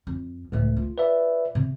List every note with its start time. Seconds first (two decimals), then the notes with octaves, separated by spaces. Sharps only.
0.07 F2
0.52 C#2 A2 D#3 A3
0.76 F4
0.98 B4 D5 E5
1.55 C3